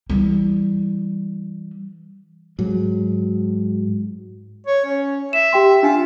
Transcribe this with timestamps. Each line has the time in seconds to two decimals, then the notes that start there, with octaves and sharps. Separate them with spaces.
0.10 E3 G3
2.59 G#2 F#3
4.67 C#5
4.85 C#4
5.33 E5 E7
5.53 G4 G5 C6
5.83 D4 F4 G#5